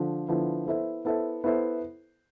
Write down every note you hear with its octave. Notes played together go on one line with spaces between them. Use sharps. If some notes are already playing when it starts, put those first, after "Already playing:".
Already playing: D3 F3
D3 F3 B3 E4
B3 E4 A4 C5 E5
B3 E4 A4 C5 E5
B3 E4 A4 C5 E5